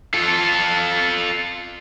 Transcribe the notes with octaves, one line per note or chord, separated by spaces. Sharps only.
F4 A4